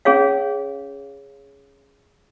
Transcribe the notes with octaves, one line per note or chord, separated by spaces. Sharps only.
C#4 G#4 C#5 F5